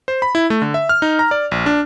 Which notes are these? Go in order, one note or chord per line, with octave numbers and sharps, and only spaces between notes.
C5
B5
E4
A3
D3
E5
F6
D#4
A#5
D5
A#1
D4